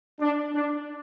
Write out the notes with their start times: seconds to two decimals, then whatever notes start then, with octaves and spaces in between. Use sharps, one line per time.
0.20 D4
0.53 D4